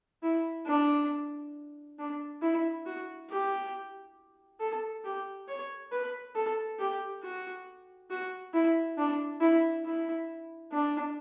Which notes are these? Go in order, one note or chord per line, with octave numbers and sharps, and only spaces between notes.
E4
D4
D4
E4
F#4
G4
A4
G4
C#5
B4
A4
G4
F#4
F#4
E4
D4
E4
E4
D4